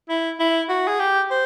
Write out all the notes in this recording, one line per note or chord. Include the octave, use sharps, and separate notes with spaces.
E4
E4
F#4
G#4
G4
C5